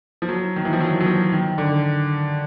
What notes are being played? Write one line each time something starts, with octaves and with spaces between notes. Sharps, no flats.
F3
F#3
D#3
E3
F3
F#3
F#3
F3
D#3
D3